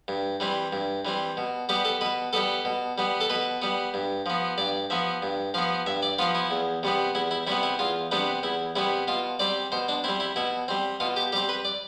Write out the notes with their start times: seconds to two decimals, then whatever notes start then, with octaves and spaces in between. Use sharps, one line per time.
0.08 G2
0.40 E3 G3 C4
0.73 G2
1.05 E3 G3 C4
1.37 B2
1.69 G3 B3 G4
1.85 A4
2.01 B2 B4
2.33 G3 B3 A4
2.65 B2
2.98 G3 B3
3.21 A4
3.30 B2 B4
3.62 G3 B3
3.94 G2
4.26 F3 B3
4.58 G2 D5
4.90 F3 B3 E5
5.22 G2
5.54 F3 B3 F5
5.86 G2 E5
6.02 D5
6.19 F3 B3 F4
6.35 E4
6.51 E2
6.83 C3 G3 B3
7.15 E2 E4
7.31 E4
7.47 C3 G3 B3 E4
7.63 E4
7.79 E2 F4
8.11 C3 G3 B3 D4
8.43 E2 E4
8.76 C3 G3 B3 E4
9.08 B2 F4
9.39 G3 C4 D5
9.72 B2 C5
9.89 D4
10.04 G3 C4 E4
10.20 E4
10.36 B2 E4
10.68 G3 C4
11.00 B2 F4
11.16 G4
11.32 G3 C4 G4
11.49 B4
11.65 D5